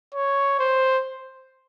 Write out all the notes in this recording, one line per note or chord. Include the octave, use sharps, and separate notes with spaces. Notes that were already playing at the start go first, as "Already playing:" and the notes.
C#5
C5